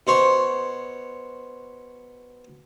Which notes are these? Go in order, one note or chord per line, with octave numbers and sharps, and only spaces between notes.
B2 C5 C#5 C6